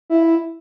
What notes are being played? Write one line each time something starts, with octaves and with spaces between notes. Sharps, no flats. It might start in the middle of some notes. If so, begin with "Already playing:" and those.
E4